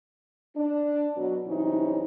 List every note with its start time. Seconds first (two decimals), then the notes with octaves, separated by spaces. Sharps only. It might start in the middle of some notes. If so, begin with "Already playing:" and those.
0.57 D4
1.17 B2 F#3
1.47 G2 C3 E3 F#3 C#4 D#4